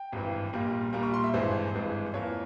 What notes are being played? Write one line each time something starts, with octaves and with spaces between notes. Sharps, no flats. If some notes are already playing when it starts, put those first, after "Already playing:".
Already playing: G5
G#1 G2 E3
A#1 A#2 G3 A#3
A#1 A#2 G3 A#3 A#5
C#6
C6
E5
G#1 G2 E3 G#3 C5
G#1 G2 E3 G#3
F2 E3 A#3 C#5